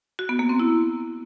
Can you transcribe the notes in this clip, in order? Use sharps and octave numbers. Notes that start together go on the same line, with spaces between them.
F#4
B3
A#3
C4
E4